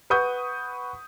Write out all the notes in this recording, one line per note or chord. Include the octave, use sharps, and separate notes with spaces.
B4 F#5 C#6 D#6 G6